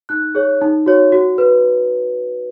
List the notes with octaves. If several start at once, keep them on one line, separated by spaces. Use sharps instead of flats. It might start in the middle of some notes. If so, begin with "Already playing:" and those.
D#4 F#6
G#4 C#5
D#4
F#4 C#5
F#4
B4